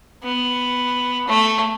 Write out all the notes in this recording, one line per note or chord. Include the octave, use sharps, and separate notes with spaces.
B3
A3